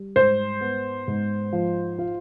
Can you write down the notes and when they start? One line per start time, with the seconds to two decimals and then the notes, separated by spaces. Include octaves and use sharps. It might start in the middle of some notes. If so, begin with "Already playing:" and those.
Already playing: G3
0.16 G#2 C5
0.61 B3
1.08 G#2
1.53 F3
1.99 F4